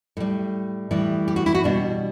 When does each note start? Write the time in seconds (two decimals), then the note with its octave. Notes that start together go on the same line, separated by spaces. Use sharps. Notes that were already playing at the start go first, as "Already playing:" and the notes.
0.17 A2 G3
0.91 A2 E3 G3
1.28 G4
1.36 F#4
1.46 E4
1.55 F#4
1.64 B2 G3 D4